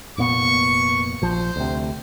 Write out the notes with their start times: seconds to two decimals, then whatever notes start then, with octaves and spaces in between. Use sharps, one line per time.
0.18 F1 A#2 B3 C#6
1.22 A#1 F3 C5
1.56 D2 C3